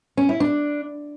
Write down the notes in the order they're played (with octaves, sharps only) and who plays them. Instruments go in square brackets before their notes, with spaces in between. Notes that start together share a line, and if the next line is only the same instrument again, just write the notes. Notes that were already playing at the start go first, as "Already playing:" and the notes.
[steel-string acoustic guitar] C#4
E4
D4